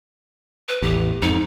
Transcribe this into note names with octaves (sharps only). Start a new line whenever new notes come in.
B4
A1 E2 G4
F2 G#2 D#4